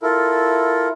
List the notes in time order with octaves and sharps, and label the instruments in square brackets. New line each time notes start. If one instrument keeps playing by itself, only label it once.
[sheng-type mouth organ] E4 F4 A4 A#4